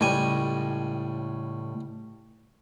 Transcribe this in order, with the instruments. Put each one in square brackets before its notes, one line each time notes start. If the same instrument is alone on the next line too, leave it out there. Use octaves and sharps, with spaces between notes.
[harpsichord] C#2 G3 G#5 [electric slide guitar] A2